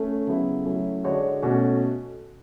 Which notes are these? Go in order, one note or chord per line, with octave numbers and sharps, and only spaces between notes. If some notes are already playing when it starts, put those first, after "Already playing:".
Already playing: A3 C#4
C#3 F#3 B3 E4 G#4
F#3 A3 C#4 E4 A4
D3 G#3 D4 F#4 C#5
B2 A3 C#4 F#4